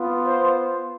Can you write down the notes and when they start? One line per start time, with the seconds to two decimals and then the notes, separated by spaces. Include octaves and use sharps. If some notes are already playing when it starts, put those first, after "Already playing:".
Already playing: B3 F4
0.26 C5